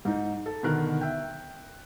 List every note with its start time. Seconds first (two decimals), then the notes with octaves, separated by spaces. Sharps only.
0.05 G#2 D#4
0.46 A4
0.63 B2 D3 D#3 A#4 F#6
1.01 E5 G5